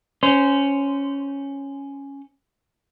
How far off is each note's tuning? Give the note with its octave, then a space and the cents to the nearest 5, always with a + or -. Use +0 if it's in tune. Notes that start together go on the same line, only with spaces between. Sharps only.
C#4 +0 C5 -15